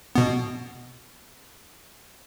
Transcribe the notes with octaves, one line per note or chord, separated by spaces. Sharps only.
B2 B3